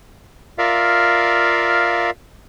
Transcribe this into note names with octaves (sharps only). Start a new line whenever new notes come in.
F4 A#4 D5 E5 F5